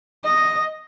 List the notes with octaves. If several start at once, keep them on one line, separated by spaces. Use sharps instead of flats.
D#5